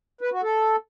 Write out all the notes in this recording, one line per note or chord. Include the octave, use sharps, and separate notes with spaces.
B4
F#4
A4